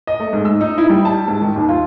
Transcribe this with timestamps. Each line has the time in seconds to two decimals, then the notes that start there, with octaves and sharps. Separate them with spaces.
0.07 D#5
0.20 A3
0.33 G#2
0.45 E6
0.61 D#4
0.78 E4
0.89 G3
1.05 A5
1.28 G#2
1.42 D#3
1.56 D#2
1.69 F4